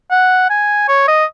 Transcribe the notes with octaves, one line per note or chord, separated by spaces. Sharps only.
F#5
G#5
C#5
D#5